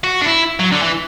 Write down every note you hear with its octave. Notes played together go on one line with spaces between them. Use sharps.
F#4
D4
E4
F#3
D3
E3